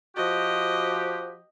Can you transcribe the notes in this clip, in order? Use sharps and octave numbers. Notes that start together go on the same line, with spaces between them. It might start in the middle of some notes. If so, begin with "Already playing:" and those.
F3 F#4 G4 D#5